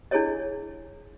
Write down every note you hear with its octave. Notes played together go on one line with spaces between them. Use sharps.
D4 E4 G#4 A4 C#5 D#5